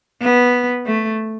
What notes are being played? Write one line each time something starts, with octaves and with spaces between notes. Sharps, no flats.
B3
A3